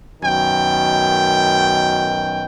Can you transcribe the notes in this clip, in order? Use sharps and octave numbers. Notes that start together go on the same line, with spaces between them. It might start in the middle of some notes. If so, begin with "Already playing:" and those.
F#2 B2 D#3 G5